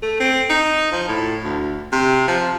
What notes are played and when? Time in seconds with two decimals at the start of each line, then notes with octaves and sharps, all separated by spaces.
0.02 A3
0.20 C4
0.50 D#4
0.92 F3
1.08 A2
1.44 D2
1.92 C3
2.28 F3